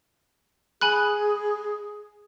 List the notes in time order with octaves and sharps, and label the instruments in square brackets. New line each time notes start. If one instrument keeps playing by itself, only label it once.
[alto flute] G#4 [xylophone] G#5 B5 F#6